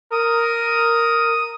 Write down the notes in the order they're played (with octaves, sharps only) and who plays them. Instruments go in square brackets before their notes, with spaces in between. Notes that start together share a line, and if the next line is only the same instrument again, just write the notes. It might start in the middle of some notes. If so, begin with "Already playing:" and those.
[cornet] A#4 [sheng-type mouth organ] D#6